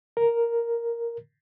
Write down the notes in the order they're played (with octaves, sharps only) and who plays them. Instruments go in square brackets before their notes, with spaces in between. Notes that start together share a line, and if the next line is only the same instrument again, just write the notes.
[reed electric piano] A#4